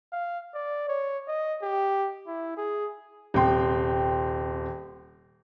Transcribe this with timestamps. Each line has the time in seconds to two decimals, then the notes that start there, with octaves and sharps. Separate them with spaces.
0.12 F5
0.54 D5
0.89 C#5
1.28 D#5
1.62 G4
2.27 E4
2.57 G#4
3.34 D#1 C3 G5 C6